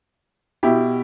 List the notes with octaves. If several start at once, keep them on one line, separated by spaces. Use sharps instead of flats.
B2 E4 G4